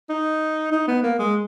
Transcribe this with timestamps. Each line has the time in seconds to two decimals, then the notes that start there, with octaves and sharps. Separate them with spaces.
0.10 D#4
0.72 D#4
0.88 B3
1.03 A#3
1.19 G#3